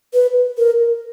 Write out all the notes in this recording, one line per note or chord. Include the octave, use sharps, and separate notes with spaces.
B4
A#4